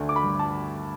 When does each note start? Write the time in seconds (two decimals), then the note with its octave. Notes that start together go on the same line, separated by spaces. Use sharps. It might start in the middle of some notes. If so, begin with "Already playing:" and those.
Already playing: D2 D3 A3
0.09 D6
0.16 B5
0.24 G2
0.39 A5